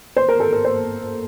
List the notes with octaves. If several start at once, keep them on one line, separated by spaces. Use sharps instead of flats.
C5
A#4
A4
A#4
C5